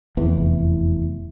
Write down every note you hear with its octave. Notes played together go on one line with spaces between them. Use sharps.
F1 E2 E3